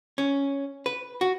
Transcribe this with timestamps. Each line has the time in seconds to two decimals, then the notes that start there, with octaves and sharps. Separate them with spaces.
0.18 C#4
0.86 B4
1.21 F#4